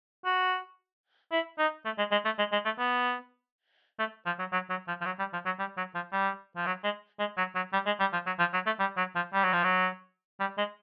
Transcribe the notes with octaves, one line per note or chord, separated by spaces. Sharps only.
F#4
E4
D#4
A3
G#3
G#3
A3
G#3
G#3
A3
B3
A3
F3
F#3
F#3
F#3
F3
F3
F#3
G3
F3
F#3
G3
F#3
F3
G3
F3
F#3
G#3
G#3
F#3
F#3
G3
G#3
G3
F3
F#3
F3
F#3
A3
G3
F#3
F3
G3
F#3
F3
F#3
G3
G#3